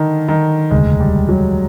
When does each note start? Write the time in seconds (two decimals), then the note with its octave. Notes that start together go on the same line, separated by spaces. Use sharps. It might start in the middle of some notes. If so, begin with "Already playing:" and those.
Already playing: D3 D#3
0.28 D#3
0.71 E1 D2 C#3 G#3
1.00 G3
1.29 F#3